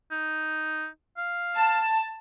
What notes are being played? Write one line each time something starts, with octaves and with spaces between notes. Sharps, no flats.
D#4
F5
A5